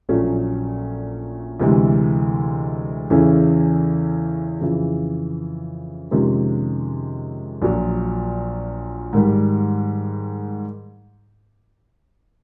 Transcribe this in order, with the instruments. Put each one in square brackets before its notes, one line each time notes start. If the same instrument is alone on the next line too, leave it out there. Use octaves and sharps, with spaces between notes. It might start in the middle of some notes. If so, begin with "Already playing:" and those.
[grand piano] A#1 A#2 F#3 A3 C#4
D2 C3 E3 G#3
E2 C#3 E3 A3 C#4
F2 C#3 E3
F2 C3 D#3 G#3 C#4
A#1 A#2 F#3
G#2 D#3 G3